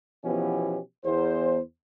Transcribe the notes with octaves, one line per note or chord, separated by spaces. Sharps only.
B2 E3 F3 B3 C#4 G4
E2 C5